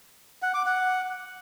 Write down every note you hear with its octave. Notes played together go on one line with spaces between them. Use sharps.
F#5
D6
F#5